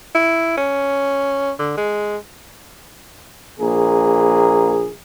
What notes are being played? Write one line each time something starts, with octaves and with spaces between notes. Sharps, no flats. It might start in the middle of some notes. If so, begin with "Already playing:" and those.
E4
C#4
D3
G#3
A#1 A#3 G#4